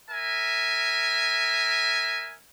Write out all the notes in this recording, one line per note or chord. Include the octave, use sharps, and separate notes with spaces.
A#4 E5 G#5